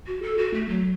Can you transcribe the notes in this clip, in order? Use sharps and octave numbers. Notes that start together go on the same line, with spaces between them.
F#4
A4
F#4
A3
F#3